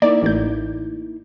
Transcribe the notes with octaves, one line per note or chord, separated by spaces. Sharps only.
A#3 D#4 E4 D5
A1 G6